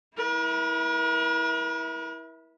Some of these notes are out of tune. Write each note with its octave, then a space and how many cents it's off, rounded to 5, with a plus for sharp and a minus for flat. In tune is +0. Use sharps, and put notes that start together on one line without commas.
E4 -15 A#4 +45